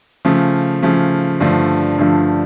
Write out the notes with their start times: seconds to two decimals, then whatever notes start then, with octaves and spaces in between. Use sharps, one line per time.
0.25 C#3 F3 A3
0.83 C#3 F3 A3
1.40 G2 D3 F3 A3
1.98 G2 D3 F3 A3